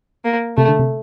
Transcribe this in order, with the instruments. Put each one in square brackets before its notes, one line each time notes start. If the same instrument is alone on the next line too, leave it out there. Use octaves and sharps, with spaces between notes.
[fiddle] A#3
[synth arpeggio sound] C3 [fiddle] A3
[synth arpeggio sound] D3
C3